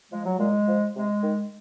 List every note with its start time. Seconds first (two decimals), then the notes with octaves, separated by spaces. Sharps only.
0.11 F3 G#3
0.25 F#3
0.39 A#2 G#3
0.68 F3
0.95 C3 G#3
1.23 D#3